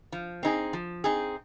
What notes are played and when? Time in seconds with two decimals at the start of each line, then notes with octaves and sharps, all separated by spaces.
0.12 F3
0.43 C4 D#4 G#4
0.73 F3
1.04 C4 D#4 G#4